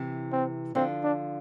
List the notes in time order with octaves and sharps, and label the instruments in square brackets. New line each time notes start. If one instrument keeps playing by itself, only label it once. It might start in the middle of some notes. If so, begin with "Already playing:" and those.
Already playing: [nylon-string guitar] C3 E3
[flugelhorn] C4
[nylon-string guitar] D3 F3 [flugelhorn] C4
[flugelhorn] D4